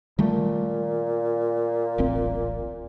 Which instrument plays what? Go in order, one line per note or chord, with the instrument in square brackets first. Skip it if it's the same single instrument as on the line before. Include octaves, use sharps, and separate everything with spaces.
[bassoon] A#2 [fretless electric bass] D#3 G3 A3
[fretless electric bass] D1 A1 C4